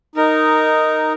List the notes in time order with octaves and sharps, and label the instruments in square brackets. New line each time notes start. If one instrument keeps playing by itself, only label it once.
[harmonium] D#4 [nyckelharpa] A#4